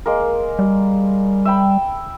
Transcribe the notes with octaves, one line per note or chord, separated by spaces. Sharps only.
G#3 A#3 A#4
G3
E5 G5 B5